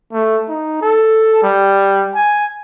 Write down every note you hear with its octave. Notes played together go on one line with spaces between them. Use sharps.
A3
D#4
A4
G3
G#5